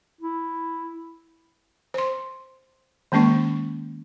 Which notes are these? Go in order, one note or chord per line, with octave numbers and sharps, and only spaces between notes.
E4
C5 C6
D#3 G#3 A#3 C#4 C#6